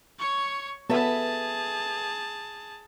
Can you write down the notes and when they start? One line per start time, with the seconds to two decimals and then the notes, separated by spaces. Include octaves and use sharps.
0.19 C#5 C#6
0.90 B3 G#4 A4 B4 E5 A5